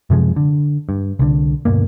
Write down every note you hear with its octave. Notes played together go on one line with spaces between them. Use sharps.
F#2 C3 F3 G#3
D3
G2
C2 D3
D2 G2 B2 A#3